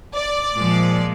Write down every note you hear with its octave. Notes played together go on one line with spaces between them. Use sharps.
D5
A#2 F3 G#3